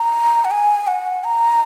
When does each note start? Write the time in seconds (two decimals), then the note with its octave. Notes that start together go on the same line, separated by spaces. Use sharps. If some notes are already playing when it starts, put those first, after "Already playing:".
Already playing: A#5
0.45 F#5
0.51 G#5
0.87 F#5
1.24 A#5